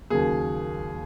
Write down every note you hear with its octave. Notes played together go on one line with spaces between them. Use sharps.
D#2 C#3 F#3 A#3 G#4